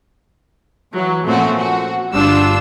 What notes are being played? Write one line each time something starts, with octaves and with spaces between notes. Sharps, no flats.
E3 F#3
A#2 F3 A3 C4 C#4 F#4
F#4
G1 G3 D4 F4 E6